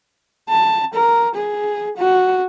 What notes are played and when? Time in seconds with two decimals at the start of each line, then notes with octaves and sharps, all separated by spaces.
0.49 A5
0.94 A#4
1.35 G#4
1.97 F#4